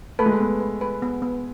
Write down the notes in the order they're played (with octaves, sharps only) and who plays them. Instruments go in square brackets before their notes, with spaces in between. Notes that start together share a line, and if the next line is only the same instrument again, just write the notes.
[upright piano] A3 [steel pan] B4
[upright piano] G#3
A3
[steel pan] B3
B4
B4
B3
B3